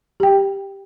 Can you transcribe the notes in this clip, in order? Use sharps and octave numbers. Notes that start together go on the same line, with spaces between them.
G4 G5